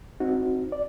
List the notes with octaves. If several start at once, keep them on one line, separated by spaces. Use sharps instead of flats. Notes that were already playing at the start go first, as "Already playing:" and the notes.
C4 D#4 F#4
D5